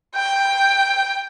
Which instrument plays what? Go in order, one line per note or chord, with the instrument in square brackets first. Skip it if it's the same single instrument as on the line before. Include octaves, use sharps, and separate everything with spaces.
[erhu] G5